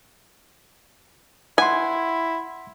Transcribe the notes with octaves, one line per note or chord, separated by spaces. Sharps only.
E4 F#5 G#5 C6